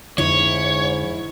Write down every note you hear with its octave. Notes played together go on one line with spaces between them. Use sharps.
F2 G#2 D3 F3 E4 C#5